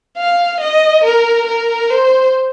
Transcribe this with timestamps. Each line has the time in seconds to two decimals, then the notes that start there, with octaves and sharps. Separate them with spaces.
0.18 F5
0.60 D#5
1.04 A#4
1.47 A#4
1.90 C5